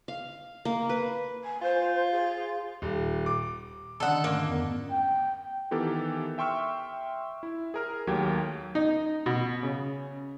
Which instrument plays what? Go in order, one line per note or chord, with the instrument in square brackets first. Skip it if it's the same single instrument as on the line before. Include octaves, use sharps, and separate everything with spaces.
[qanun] F5
A#3
B4
[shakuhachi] G#5
[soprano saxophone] F4 [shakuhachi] C5
[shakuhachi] G#4
[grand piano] D#1
D6
[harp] D3 D#5 E6 [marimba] D#3 C#4 [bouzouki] A4 F#5
[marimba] G#2 A3 C#4 [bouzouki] A#3
[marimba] F2 B3
[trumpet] G5
[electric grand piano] D#3 E3 B3 G4 A4 A#4
E5 G5 C6 C#6 E6 F6
E4
G#4 A#4 F6
D#2 F#3 A3 G4 G5 G#6
[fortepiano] D#4
B2
C#3